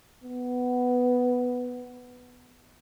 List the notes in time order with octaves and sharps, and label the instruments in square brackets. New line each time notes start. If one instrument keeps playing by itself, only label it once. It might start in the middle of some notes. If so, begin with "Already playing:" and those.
[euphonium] B3